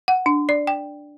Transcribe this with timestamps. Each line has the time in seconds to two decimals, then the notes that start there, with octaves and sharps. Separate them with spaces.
0.08 F#5
0.26 D4
0.49 D5
0.67 G5